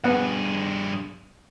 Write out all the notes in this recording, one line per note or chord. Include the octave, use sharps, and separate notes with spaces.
G2 B3 G#4 F#5